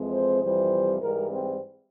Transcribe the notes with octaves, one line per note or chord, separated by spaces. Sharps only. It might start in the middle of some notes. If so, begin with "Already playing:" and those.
Already playing: F2 E3 G#3 C4
C5
F2 C3 E3 G3 C5
G#2 E3 G3 A#4
C4